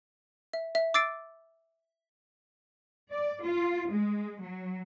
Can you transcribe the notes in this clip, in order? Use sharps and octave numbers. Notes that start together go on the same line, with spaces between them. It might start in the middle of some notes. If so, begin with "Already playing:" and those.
E5
E5
D6 E6 A6 C7 D7
D5
F4
G#3
F#3